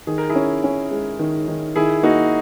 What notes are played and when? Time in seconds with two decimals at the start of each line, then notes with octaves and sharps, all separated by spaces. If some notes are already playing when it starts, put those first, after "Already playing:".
0.07 D#3 G#4
0.18 A#4
0.29 E4 G#4
0.35 C#4
0.64 C#4
0.91 G#3
1.19 D#3
1.48 D#3
1.76 D#3 E4 G#4
2.03 A#3 D#4 F#4